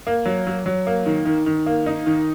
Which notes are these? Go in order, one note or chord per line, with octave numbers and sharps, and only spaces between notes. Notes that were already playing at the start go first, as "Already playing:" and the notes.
A#3
F#3
F#3
F#3
A#3
D#3
D#3
D#3
A#3
D#4
D#3